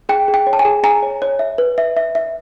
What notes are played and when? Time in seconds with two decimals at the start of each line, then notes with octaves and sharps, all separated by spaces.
0.09 G#4 G5
0.28 G#4
0.34 G5
0.47 C#5
0.53 A5
0.59 G#5
0.65 G#4
0.83 G#4 G#5 A#5
1.03 C#5
1.22 C#5
1.39 E5
1.58 B4
1.78 E5
1.97 E5
2.15 E5